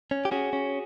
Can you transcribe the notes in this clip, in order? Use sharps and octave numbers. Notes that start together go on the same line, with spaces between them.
C#4
G4
C#4 F#4 G#4
C#4